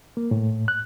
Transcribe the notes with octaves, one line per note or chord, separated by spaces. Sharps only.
A#3
A2
F#6